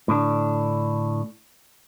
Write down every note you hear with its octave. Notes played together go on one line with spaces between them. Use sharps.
A2 D3 D4